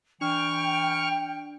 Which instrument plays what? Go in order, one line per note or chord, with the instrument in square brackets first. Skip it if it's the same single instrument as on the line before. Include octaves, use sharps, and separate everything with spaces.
[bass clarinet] E3 [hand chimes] D4 [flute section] G5 [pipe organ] C#6 F6